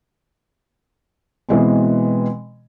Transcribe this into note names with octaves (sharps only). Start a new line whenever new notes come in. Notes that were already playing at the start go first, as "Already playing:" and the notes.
B2 E3 G#3 C4